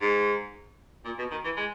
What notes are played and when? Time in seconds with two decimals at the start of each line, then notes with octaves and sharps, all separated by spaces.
0.01 G#2
1.05 A#2
1.18 B2
1.31 D#3
1.45 E3
1.57 G#3